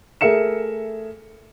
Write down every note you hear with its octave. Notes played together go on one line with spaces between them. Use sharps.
A3 G#4 A#4 E5 C#7 E7